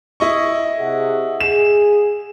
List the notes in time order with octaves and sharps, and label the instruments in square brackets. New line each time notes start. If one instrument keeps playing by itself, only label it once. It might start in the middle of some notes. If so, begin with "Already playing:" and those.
[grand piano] E4 D#5 C#6
[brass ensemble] C3 G#4 F#5
[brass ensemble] G#4 [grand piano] E7